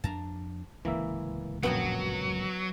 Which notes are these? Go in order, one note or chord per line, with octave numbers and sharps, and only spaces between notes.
F2 D4 A5 A#5
D1 C#2 E3 A#3 E5
A#1 F#2 F#3 B3 G5 A#5